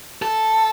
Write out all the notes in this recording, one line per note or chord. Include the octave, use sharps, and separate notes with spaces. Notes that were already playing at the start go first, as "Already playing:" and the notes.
A4